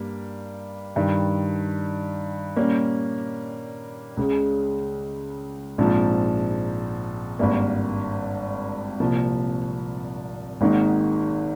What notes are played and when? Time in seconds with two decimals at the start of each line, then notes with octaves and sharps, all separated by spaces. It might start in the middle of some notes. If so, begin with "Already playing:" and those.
Already playing: G2 G3 A#3
0.96 G2 D#3 G3
2.56 A#2 G3 A#3 C#4
4.17 C#2 C#3 G#3
5.78 A#1 G#2 F3 G#3 C4
7.39 G#1 G2 G3 A#3
9.00 C2 A#2 F3 A#3
10.61 G#1 G#2 D#3 A#3 D#4